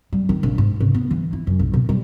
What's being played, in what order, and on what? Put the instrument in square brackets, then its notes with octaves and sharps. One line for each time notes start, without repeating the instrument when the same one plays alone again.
[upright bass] G3
D#3
A#1
G#2
C#3
B3
E3
E4
F#2
B1
B2
G3